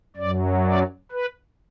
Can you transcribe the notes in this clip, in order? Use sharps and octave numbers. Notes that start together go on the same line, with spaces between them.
F#2 F#3 D5
D5
B4